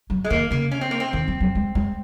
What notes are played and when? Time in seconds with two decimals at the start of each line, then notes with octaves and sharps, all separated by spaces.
0.10 F#3
0.24 G#3
0.30 D#3 A#3
0.51 C#3 A#3
0.71 C#4
0.81 C4
0.91 A#3
1.00 C4
1.13 D#3
1.28 F3
1.41 F#3
1.55 G#3
1.75 G#3